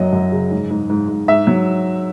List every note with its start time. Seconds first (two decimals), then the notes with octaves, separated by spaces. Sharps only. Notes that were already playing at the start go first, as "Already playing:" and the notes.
Already playing: F#2 F#3 D#5
0.13 F#2
0.32 C#3
0.51 G#2
0.70 G#2
0.90 G#2
1.09 G#2
1.28 G#2 E5
1.47 F#3